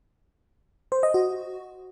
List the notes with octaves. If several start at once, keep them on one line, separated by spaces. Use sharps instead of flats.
C5
D#5
F#4